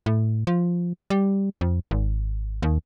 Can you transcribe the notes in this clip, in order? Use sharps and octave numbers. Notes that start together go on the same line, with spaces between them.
A2
F3
G3
F2
G#1
D#2